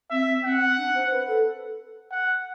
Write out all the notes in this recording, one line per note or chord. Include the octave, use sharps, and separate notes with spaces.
C4 E5
C4 F#5
D4
C5
B4
A4
F#5